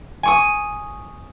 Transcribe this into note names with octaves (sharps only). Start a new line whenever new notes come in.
G#5 C#6 D#6